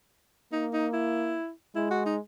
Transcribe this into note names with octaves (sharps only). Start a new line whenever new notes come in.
A#3 D#4
D#4
E4
G#3 E4
F#4
D#4